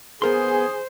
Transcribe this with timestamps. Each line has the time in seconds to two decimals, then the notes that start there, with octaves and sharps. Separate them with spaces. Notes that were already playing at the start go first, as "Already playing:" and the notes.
0.22 B3 G#4 A#4 C5 C6